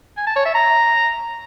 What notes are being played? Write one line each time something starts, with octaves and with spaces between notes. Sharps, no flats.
G#5
A5
C#5
E5
A#5